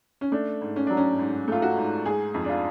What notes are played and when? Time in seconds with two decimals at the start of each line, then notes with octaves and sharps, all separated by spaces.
0.21 C#4
0.32 A3 D4
0.61 G#2
0.76 C#4
0.87 F#3 D4
0.97 C#4
1.19 G#2
1.48 A3 F4
1.62 F#4
1.77 G#2
2.06 G#3 G#4
2.34 F2
2.44 D4
2.49 F4